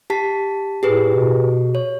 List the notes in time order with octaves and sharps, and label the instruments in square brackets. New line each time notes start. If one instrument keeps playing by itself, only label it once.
[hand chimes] G4 A5 B6
[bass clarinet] A2 [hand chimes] G4 G#4 B4
[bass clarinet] B2
[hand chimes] C#5